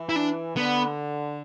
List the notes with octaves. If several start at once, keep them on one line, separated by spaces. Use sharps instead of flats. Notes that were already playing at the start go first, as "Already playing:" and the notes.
Already playing: E3
E4
D4
D3 B3